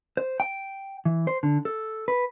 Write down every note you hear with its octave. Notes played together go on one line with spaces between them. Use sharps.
C5
G5
E3
C5
D3
A4
B4